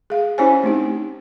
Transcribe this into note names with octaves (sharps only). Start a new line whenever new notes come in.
G#4 F5
C#4 E4 G4 C5 C#5 G#5
A3 C4 D#4 G4